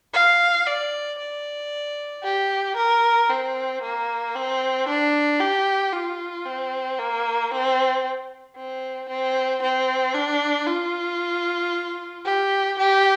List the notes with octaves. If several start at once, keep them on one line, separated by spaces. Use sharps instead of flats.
F5
D5
D5
G4
A#4
C4
A#3
C4
D4
G4
F4
C4
A#3
C4
C4
C4
C4
D4
F4
G4
G4